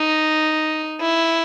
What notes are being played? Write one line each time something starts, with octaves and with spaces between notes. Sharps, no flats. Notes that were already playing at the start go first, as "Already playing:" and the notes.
Already playing: D#4
E4